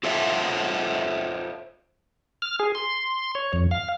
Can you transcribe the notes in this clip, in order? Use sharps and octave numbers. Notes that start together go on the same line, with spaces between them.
F4 A4 C5 C#5 E5
F6
G#4
C6
C#5
F2
F5